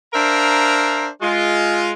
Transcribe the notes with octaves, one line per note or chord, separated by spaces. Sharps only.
D4 A#4 C5 E5 F5 A#5
G#3 F4